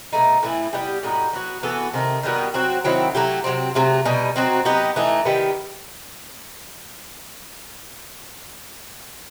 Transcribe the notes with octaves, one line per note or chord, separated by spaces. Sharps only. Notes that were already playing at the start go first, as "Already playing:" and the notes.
B2 A3 D#4
A2 E3 A3 E4
G3 B3 D#4 G4
A2 G3 D#4 F#4
F#3 B3 F#4
E3 B3 F#4 A4
C3 D#3 A3
D#3 G3 B3 F#4
F#3 C4 F#4
D#3 F#3 C4 E4
F#3 A3 E4 G4
C3 F#3 C4
C3 F#3 A3
B2 G3 D#4
F#3 C4 D#4 F#4
F#3 B3 D#4 G4
E3 A3 D#4
D#3 G3 B3